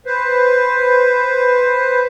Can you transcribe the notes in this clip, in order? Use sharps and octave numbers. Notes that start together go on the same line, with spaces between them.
B4 C5